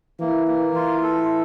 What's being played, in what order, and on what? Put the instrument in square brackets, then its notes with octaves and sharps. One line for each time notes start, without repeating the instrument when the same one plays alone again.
[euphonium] E3 [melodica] A#3
[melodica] A#3
[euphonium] E3 [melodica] F4
[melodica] A4